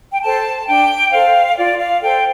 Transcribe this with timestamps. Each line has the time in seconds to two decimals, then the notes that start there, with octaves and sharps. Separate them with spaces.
0.11 G5
0.22 A4 C5 A5
0.67 D4 G5
1.11 A4 C5 F5
1.55 F4 D5
1.77 F5
2.00 A4 C5 G5